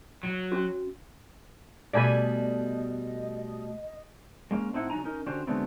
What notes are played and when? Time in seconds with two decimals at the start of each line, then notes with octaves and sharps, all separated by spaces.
0.23 F#3
0.52 C#4 F#4
1.93 B2 G3 A3 D5 D#5 G#5 B5
4.51 G#3 A#3 C#4
4.73 A2 C4 D#4 E4 F#5
4.90 C#3 F#3 D#4 G#5 A#5
5.04 C#4 D#4 A#4
5.26 D3 C#4 F#4 G4 C5
5.47 D3 F#3 G#3 A3 B3 C4